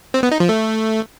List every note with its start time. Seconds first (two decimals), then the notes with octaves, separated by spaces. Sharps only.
0.14 C4
0.23 B3
0.32 D#4
0.40 F3
0.49 A3